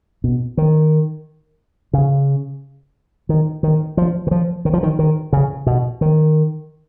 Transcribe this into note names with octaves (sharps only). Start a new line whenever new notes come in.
B2
D#3
C#3
D#3
D#3
F3
D#3
F3
D#3
F3
D#3
D#3
C#3
B2
D#3